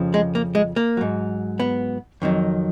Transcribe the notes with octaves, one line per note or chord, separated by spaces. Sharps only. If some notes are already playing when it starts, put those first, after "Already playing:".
Already playing: F2 C#3 F3
G#3
A#3
G#3
A#3
G#2 F#3
B3
F2 D#3 F#3